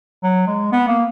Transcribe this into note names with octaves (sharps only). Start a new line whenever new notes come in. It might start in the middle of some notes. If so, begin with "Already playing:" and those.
F#3
G#3
B3
A#3